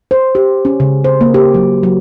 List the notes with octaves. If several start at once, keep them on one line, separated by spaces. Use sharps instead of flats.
C5
G4
C#4
C#3
C5
A#3
G4
F#3
F#3